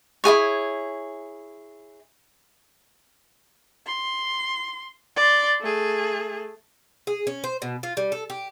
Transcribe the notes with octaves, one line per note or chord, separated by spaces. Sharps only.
E4 F4 G#4 C#5
C6
D5 C6
A3 G#4
G#4
C#4
C5
B2
F4
G3
A4
G4